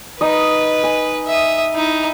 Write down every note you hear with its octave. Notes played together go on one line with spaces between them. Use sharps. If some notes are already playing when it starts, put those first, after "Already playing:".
D#4 B4 D#5
G#5
E5 D#6
D#4 E4